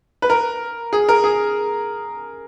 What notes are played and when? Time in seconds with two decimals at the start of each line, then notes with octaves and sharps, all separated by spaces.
0.22 B4
0.30 A#4
0.93 G#4
1.09 A#4
1.24 G#4